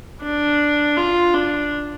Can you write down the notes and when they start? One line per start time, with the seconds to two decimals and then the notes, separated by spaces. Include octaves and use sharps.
0.22 D4
0.97 F4
1.34 D4